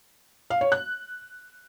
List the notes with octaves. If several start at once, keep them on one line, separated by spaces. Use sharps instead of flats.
F5
C#5
F#6